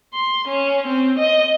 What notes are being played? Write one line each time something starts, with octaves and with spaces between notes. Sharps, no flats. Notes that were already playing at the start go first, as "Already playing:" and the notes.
C6
C#4
C4
D#5